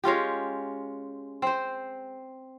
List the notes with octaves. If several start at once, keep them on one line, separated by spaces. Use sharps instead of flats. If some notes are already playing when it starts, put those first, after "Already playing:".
G#3 C#4 F4 G4
C4 C5